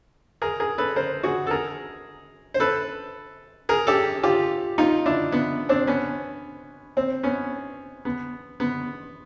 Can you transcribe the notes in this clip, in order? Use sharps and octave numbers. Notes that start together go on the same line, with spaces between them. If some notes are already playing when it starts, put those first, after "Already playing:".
G#4 A#4
G#4 A#4
A4 B4
A#4 C5
F#4 G#4
A4
G#4 A#4
C5
A4 B4
G#4 A#4
G4 A4
F4 G4
D#4 F4
D4 E4
B3
C4 D4
B3 C#4
C4
B3 C#4
B3
B3